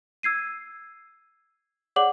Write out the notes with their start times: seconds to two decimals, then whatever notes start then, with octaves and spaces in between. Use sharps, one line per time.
0.23 E6 G#6 C7 D#7
1.96 G#4 C#5 D5 F#5 D6 F#7